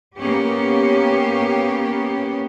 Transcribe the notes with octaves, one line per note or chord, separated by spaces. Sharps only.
A#3 B3 C#4 G4